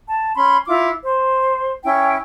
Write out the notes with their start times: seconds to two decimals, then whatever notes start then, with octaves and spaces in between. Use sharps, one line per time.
0.08 A5
0.35 C#4 B5 C6
0.66 E4 F4 D6
1.03 C5
1.84 C#4 E4 G5